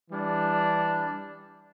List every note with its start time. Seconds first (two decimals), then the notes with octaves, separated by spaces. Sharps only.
0.11 E3 G3 D4